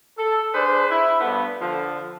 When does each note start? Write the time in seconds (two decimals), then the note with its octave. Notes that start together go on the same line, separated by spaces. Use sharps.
0.18 A4
0.53 D4 G#4 B4 C5
0.90 E4
1.20 G2 A3 B3
1.61 D3 F3